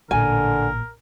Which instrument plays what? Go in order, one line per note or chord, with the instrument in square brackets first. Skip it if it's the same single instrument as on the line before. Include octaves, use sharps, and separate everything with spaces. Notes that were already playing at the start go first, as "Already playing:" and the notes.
[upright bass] A1 A#2 [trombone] D3 [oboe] A#4 [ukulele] G#5